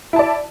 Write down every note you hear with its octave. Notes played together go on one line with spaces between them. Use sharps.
E4 D5 A5